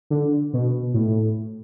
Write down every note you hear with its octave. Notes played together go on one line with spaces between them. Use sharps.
D3
B2
A2